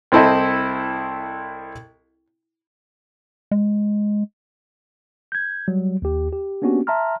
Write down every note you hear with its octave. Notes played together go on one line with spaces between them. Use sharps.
C2 C4 E4 A4 D#5
G#3
G6 G#6
F#3 G3
D#2 G4
G4
A#3 B3 C#4 D4 F#4 G4
E5 A5 A#5 C6 F6